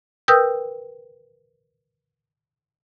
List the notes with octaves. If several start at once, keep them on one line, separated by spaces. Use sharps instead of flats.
A#4 B4 G5 D#6 E6 G6